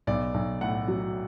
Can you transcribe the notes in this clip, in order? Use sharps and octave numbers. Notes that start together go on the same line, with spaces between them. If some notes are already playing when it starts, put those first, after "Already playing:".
B1 D5
B1
A2 F#5
F#3